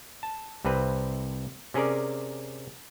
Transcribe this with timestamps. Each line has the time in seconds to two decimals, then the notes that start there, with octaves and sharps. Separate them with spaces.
0.23 A5
0.65 C2 C3 C4 B4
1.74 C3 C#4 G#4 A#4 D5